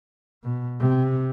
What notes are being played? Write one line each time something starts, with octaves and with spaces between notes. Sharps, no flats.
B2
C3